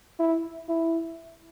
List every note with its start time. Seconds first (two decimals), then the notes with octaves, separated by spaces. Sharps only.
0.20 E4
0.69 E4